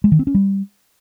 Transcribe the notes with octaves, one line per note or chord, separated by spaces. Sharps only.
G#3
D#3
C4
C#4
G3